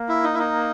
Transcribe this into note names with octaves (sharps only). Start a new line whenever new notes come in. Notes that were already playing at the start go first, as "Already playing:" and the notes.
Already playing: A#3
E4
D#4
E4
D#4